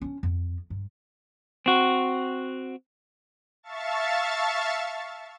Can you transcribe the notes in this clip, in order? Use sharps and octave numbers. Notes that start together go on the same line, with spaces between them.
C#4 D4
F2
G2
C4 F#4
E5 F5 A5 C#6 A6